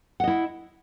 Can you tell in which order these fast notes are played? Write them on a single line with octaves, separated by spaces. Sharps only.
F#5 D#5 E4